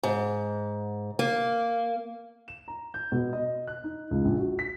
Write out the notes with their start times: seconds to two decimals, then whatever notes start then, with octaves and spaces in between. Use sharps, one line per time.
0.03 G#2
1.19 A#3
2.48 E7
2.68 A#5
2.94 G6
3.12 B2
3.33 D#5
3.67 F#6
3.84 D#4
4.11 C#2
4.25 A#1
4.39 F#4
4.59 B6